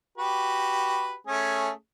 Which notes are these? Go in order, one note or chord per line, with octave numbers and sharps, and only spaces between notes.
F#4 G4 B4
A3 C#4 G#4